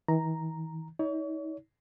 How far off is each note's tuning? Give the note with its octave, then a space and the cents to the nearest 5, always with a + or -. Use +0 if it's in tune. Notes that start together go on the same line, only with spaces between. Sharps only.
E3 -45 A#5 +0
D#4 +40 C#5 +40